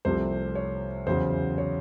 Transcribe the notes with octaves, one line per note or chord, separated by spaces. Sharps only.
C2 C3 F3 A3 C5
C#5
E2 C#3 F#3 C5
C#5